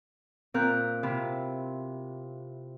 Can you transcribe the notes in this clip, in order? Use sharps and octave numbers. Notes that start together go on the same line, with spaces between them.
A#2 C4 A#4 F#6 G6
C3 E4 F4